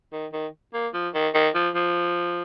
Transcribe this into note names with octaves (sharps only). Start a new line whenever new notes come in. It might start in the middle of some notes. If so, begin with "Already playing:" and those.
D#3
D#3
A#3
F3
D#3
D#3
F3
F3